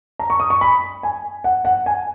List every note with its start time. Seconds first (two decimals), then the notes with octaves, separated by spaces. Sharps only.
0.19 A#5
0.30 C#6
0.40 D#6
0.50 C#6
0.61 B5
1.03 G#5
1.44 F#5
1.65 F#5
1.86 G#5